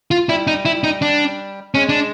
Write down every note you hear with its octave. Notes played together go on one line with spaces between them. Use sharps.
F4
G3 E4
D#4
E4
D#4
D4
G#3 C#4
D4